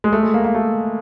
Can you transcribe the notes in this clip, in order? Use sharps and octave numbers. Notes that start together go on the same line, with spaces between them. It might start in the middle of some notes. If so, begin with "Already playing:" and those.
G#3
A3
G#3
A#3
A#3
A3